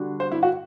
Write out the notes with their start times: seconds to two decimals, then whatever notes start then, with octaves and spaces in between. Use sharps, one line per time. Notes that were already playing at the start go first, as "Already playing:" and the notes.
Already playing: D3 G3 D4 F#4
0.20 C5
0.32 E4
0.43 F#4